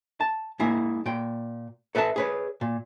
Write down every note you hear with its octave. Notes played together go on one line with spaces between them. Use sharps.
A5
G#3 A#3 E4
A#2 G5
A4 B4 E5 F#5 A5
G#4 B4 C#5
A#2